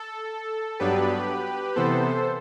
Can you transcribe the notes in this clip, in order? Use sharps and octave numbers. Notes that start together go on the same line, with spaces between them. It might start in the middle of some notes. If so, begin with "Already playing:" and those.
Already playing: A4
G2 F#3 B3 D4 G4 B4
C3 E3 B3 A4 C5